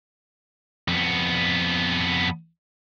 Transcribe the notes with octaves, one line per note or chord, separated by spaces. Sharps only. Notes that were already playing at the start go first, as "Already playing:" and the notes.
F2 B3